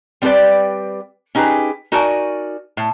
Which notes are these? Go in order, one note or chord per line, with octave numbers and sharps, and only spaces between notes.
G3 C4 G4 A4 B4 D5
C#4 D#4 G4 G#4 B4
D#4 F#4 A#4 D5 G#5
A2